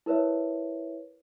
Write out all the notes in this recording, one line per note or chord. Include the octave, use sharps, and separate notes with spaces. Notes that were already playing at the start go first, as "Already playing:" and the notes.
E4 A#4 B4 C#5 E5